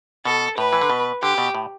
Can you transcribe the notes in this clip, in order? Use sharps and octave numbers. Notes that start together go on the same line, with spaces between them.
B2 A4
A2 B4
E3
D3
B2
D3 G4
B2
A2